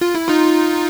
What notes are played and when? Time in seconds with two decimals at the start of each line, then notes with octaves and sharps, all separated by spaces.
0.01 F4
0.15 E4
0.28 D#4 F4